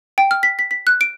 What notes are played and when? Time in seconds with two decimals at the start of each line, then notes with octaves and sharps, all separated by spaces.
0.18 G5
0.31 F6
0.43 B6
0.59 B6
0.71 B6
0.87 F#6
1.01 D7